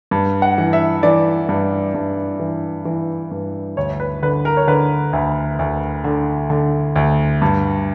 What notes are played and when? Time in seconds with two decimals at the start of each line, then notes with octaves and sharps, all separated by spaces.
0.11 G2
0.42 F#5
0.58 E3
0.73 E5
1.03 E3 D5
1.49 G2
1.94 G2
2.40 E3
2.85 E3
3.31 G2
3.77 D2 C#5
4.00 B4
4.22 D3 B4
4.45 A#4
4.57 C#5
4.67 D3 B4
5.13 D2
5.59 D2
6.04 D3
6.50 D3
6.96 D2
7.42 G2